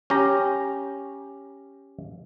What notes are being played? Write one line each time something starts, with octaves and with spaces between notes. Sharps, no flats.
C#4 G4 A#5